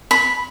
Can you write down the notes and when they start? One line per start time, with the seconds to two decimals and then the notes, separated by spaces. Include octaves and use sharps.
0.11 B5